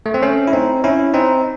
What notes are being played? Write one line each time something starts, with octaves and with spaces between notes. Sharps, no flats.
A3
C4
A3 C#4
E4
C4 D#4
C#4 E4
C4 D#4